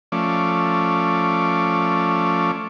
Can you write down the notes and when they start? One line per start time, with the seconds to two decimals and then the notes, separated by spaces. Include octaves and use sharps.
0.12 F3 A3 C#4 D5